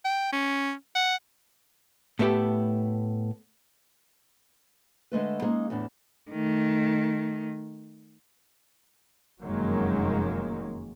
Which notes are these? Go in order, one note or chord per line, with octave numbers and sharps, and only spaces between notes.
G5
C#4
F#5
A2 A3 B3 E4 G4 A4
D3 G#3 A3 B4
G#3 A#3 C#4 D#4 G#4
E2 A2 D4
D#3 A3
F1 F#2 D#3 F#3 G#3 A#3